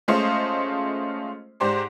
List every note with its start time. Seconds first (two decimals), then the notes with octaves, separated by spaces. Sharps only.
0.08 G#3 A3 C#4 F4 C5 D#5
1.60 G#2 G4 C5 D5